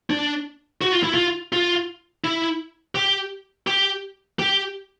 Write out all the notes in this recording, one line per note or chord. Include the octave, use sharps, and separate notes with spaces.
D4
F#4
F4
E4
F4
F4
E4
G4
G4
G4